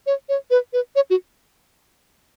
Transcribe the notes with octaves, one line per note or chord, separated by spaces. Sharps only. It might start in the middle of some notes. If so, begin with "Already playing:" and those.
C#5
C#5
B4
B4
C#5
F#4